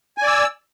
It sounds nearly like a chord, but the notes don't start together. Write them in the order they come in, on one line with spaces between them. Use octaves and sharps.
G#5 D5 E6